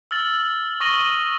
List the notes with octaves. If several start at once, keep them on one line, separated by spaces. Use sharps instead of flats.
E6 F6 A6 F#7
C#6 D#6 A#6 D#7 F#7 G7